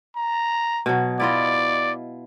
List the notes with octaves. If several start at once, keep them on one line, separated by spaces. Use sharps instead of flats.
A#5
B2 F#3
E4 F4 D5 D#5